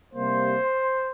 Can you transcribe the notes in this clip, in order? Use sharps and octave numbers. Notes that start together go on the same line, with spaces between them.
C3 G3 A#3 C5